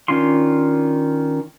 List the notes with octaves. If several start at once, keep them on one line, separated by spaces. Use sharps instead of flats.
D#3 C#4 D4 F4 C6